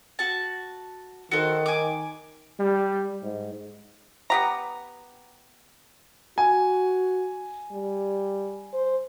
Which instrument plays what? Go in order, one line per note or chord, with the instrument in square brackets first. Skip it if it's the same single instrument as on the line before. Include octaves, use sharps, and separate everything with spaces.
[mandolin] F#4 A5
[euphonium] D#3 [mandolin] F#4 A4 C5
[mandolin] G#5 D6
[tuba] G3
G#2
[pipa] B3 G4 A#5
[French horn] F#4 [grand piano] G#5
[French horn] G3
C5